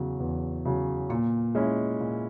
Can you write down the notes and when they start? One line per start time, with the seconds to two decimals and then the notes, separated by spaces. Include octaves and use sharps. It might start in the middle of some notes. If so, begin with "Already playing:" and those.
Already playing: E2 C#3 F#3 B3
0.20 E2
0.65 C#3 F#3
1.10 A#2 A#3
1.55 G#3 C#4 E4
2.00 A#2